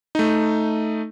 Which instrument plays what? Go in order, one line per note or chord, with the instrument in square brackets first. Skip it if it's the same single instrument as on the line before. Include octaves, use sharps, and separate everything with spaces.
[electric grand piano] A3 D#4